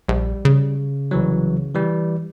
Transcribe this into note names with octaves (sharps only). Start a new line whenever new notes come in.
A#1 G3
C#3
C2 E3 F#3
E3 G3